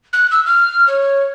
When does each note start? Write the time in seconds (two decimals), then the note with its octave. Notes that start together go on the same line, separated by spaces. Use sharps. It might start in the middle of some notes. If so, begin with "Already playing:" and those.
0.13 F#6
0.31 E6
0.46 F6
0.88 C#5